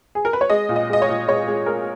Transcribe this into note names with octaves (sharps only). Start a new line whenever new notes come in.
G#4
A#4
B4
C#5
G#3 D#5
A#2
D#5
G#3 D#5
C#5
A#2
G#3 C#5
G#3
G#3 A#4